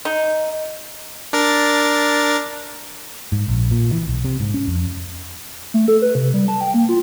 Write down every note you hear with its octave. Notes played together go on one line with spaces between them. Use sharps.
D#4
D4 A#4 A6
G#2
A#1
A#2
E3
B1
C3
G#2
C#4
F2
A3
A4
B4
C3
G3
A5
G5
A#3
F4